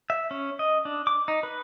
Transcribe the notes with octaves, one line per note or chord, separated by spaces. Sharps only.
E5
C#4
D#5
D4
D6
D#4
B4